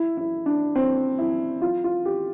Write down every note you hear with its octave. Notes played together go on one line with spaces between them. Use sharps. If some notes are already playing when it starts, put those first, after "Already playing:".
Already playing: E4
E4
D4
C4
E4
F4
F4
G4